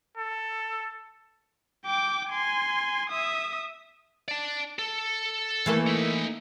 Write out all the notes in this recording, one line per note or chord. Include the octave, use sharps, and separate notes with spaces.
A4
G5 D6
G#5 C6
E5 D#6
D5 A5
A4
E3 A3 A#3
D#4 E5